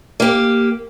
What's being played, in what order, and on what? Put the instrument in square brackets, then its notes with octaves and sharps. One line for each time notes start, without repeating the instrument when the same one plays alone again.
[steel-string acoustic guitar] A#3 G4